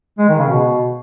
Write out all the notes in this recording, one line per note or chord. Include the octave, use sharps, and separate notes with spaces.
G#3
D#3
C#3
B2